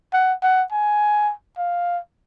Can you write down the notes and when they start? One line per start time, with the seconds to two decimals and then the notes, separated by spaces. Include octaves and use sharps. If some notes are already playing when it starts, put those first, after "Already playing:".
0.13 F#5
0.43 F#5
0.72 G#5
1.58 F5